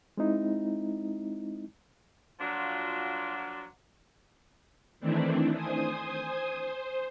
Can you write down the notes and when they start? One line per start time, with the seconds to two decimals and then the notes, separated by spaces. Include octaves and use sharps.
0.17 G#3 C4 D#4 E4
2.40 F3 F#3 A#3 D4 F4 F#4
5.00 D#3 E3 A3 C4 D4 E4
5.55 C5 G#5 D#6
6.55 C5